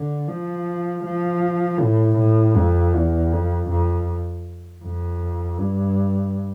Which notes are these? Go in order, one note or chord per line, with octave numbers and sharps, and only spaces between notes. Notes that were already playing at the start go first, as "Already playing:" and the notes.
Already playing: D3
F3
F3
A2
A2
F2
E2
F2
F2
F2
G2